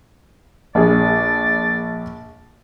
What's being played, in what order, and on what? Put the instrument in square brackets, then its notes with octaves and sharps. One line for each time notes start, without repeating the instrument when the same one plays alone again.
[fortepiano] A#1 G#4 [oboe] D5